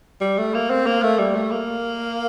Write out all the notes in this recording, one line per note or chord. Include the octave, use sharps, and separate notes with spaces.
G3
A3
A#3
C4
A#3
A3
G3
A3
A#3